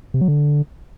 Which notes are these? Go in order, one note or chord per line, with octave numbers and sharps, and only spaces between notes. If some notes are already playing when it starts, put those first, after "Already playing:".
C3
F#3
D3